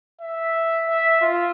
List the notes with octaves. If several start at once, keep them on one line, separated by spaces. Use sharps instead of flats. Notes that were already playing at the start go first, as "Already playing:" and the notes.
E5
E5
F4